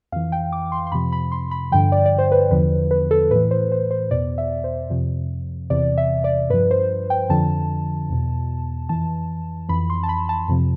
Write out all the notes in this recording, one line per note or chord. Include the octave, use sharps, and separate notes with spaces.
F2 E3 F5
G5
D6
C6
C6
F2 C3 F3 B5
B5
C6
B5
G2 D3 F3 G5
D5
D5
C5
B4
E2 D3 F3 B4
B4
A4
A2 E3 B4
C5
C5
C5
E2 B2 D5
E5
C5
F2 C3 F3
E2 C3 E3 D5
E5
D5
G2 F3 B4
C5
G5
F2 D3 F3 A5
E2 B2
F2 E3 A5
F2 E3 B5
C6
A5
B5
A5
F2 C3 F3